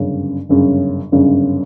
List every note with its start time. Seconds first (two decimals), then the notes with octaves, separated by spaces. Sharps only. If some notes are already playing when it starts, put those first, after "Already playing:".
Already playing: G1 F#2 C#3
0.49 G1 F#2 C#3
1.12 G1 F#2 C#3